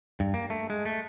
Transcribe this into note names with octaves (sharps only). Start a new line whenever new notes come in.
G2
A#3
A3
G#3
A3